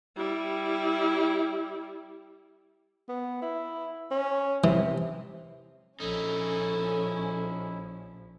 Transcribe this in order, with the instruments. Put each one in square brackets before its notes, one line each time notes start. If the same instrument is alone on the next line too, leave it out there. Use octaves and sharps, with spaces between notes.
[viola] G3 E4
[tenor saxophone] B3
E4
C#4
[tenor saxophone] C3 [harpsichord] E3
[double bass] A#1 F3 [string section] C#4 [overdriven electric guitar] D#4 E4 [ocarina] A4